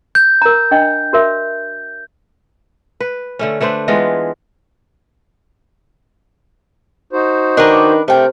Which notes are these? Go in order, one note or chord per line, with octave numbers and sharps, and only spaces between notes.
G6
A#4 A#5
D4 D#5 G5
F#4 A#4 E5
B4
D3 A3 C#4
A3 D4 B4 C5
E3 G#3 B3 F4
D#4 F#4 C5
D#3 D4 A#4 B4
C3 A3 A#4 G5